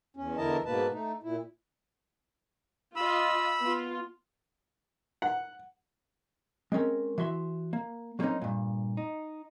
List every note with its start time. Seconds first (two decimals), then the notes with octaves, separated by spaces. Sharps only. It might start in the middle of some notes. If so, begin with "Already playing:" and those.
0.17 E2 C#4
0.37 E2 D3 E4 A#4 D#5 A5
0.66 G#2 B2 A#3 B4 A5
0.92 A3 D#4
1.23 A#2 E4
2.96 F4 D#5 B5 E6
3.61 B3 F4
5.22 F#5
6.72 G#3 C4 C#4 A#4
7.18 E3 F#4 E5 C6
7.73 A#3
8.19 F#3 G3 A#3 C4 C#4 D#4
8.42 G2 A#2
8.97 D#4